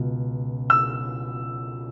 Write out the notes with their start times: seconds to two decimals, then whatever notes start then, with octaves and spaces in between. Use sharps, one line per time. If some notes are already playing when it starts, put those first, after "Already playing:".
Already playing: C#2 B2
0.70 E6